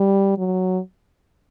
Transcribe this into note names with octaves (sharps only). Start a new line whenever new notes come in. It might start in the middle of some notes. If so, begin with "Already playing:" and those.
Already playing: G3
F#3